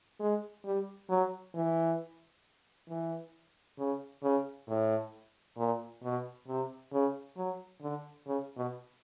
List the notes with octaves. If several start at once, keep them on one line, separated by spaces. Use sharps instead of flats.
G#3
G3
F#3
E3
E3
C#3
C#3
A2
A#2
B2
C3
C#3
F#3
D3
C#3
B2